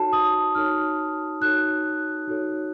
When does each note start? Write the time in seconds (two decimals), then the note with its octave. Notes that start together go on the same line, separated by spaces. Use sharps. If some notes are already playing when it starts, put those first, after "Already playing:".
Already playing: D#4 F#4 A4 C#5 A5
0.13 D#6
0.55 D#4 F#4 A4 C#5 F6
1.41 D#4 F#4 A4 C#5 F#6
2.27 D#4 F#4 A4 C#5